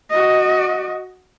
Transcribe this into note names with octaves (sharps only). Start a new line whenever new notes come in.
F#4 D#5